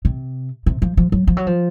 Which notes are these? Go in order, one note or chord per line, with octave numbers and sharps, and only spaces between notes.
C3
C3
F3
F3
F#3
F3
F#3
F3